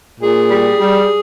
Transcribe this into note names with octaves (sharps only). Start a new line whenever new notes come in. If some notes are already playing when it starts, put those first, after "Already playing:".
A#2 G#4
G3
G3